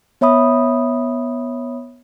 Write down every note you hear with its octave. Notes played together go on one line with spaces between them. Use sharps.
B3 C#5 E5 B5 D#6